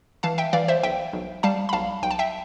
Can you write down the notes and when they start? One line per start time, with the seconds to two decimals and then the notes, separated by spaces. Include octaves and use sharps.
0.23 E3 F5 A5
0.38 E5 G5
0.53 E3 D5 F5
0.68 C5 E5
0.83 B1 E5 G5
1.13 B1
1.43 G3 F5 A5
1.69 B5
1.73 B1 F5 A5
2.02 B1 G5
2.11 A5
2.19 E5 G5